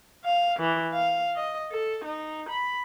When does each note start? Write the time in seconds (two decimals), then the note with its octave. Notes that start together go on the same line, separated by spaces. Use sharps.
0.25 F5
0.59 E3
0.93 F5
1.36 D#5
1.72 A4
2.05 D#4
2.49 B5